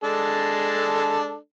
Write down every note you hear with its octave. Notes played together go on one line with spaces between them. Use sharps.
G#3 D4 A4